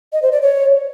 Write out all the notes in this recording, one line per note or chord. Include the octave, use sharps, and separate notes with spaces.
D#5
C5
D5
C#5